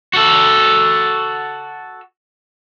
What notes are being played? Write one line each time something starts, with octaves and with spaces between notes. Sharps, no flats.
F#4 A4